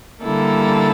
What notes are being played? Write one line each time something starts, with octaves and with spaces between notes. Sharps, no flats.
D3 G3 A#3 E4 A4